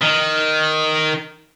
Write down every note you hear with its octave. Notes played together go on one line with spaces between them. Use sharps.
D#3